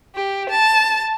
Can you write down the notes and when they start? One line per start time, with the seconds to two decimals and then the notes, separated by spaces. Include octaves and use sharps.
0.16 G4
0.50 A5